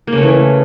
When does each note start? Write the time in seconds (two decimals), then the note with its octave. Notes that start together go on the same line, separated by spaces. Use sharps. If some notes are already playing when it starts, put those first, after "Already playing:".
0.07 A#3
0.13 C#3
0.18 A3
0.23 E3